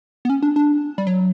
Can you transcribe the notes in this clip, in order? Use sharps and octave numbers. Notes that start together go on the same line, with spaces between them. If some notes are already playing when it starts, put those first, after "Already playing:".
B3
C#4
D4
D4
G3
F#3